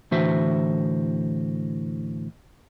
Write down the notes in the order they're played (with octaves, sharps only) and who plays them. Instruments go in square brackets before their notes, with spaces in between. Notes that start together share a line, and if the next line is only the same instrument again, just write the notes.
[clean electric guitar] A2 D3 E3 F#4 C5 E5